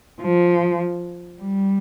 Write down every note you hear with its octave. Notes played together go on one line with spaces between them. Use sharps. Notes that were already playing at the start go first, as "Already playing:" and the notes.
F3
G3